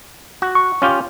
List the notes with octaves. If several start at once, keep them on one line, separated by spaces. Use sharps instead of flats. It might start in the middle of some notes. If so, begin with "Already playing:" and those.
F#4
C#6
C#4 F4 G4